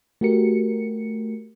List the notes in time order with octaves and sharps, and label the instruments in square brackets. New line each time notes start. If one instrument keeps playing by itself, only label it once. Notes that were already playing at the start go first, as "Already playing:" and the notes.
[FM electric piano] A3 F#4 G4 A#4 C#7